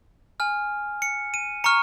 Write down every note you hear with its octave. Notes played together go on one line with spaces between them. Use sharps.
G#5 F6
C#7
D#7
A#5 C#6 F6 C#7